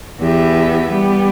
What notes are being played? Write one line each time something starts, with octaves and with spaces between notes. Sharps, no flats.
E2 E3 B3 G4 E5
G3 B3 G4